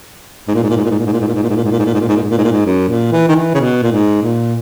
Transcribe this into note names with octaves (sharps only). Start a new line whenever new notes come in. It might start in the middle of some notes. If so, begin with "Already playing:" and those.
G#2
A#2
G#2
A#2
G#2
A#2
G#2
A#2
G#2
A#2
G#2
A#2
G#2
A#2
G#2
A#2
G#2
A#2
G#2
A#2
G#2
A#2
G#2
A#2
G#2
A#2
G#2
A#2
G#2
F#2
A#2
E3
D#3
E3
C#3
B2
A#2
G#2
A#2